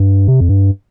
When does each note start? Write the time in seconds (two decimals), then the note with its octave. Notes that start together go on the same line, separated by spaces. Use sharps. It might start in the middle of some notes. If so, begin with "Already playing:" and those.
Already playing: G2
0.28 C3
0.40 F2
0.49 G2